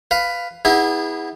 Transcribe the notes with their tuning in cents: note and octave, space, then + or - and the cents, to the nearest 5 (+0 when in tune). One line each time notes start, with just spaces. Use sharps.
B4 +10 F5 +0
B3 +0 E4 -30 G#4 -30